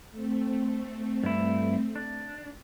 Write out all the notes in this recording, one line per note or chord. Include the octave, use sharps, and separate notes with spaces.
A3 C4
G2 E4
D4